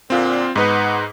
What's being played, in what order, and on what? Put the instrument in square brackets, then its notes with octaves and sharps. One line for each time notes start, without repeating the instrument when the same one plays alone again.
[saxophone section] A#2 D3 [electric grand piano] C4 F4
[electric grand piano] G#2 D#4 B4 [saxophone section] B3